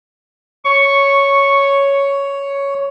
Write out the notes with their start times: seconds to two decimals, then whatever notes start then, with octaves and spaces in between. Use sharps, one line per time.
0.65 C#5 C#6